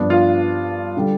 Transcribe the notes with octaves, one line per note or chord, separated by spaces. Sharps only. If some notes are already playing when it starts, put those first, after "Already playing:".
Already playing: G2 F3 B3 D4
F4
D3 G3